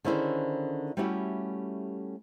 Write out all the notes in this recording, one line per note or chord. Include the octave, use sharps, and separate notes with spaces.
D3 D#3 C#4 E4 G#4 C5
G3 A3 C#4 E4 F#4 G4